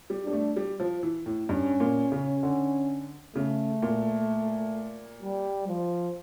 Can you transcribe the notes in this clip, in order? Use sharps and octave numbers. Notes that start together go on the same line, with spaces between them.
G3
G3 D4
A3
G3
F3
E3
A2
G2 C#4
A#2
C#3
D3
C#3 A3
A#2
G3
F3